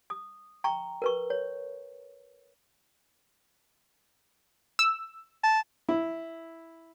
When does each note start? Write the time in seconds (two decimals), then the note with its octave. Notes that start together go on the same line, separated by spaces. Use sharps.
0.10 D#6
0.64 G5 A#5 C#6
1.02 A#4 B4 C#6
1.30 C#5
4.79 E6
5.44 A5
5.89 E4